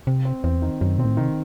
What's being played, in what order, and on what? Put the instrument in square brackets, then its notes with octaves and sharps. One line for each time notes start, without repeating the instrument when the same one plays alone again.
[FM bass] C3 [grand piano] C4
[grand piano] C4
[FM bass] E2 [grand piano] C4
[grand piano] D#3
[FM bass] F#2 [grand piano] D#3
[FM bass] B2 [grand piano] C4
[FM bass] A2
[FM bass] C3 [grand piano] D#3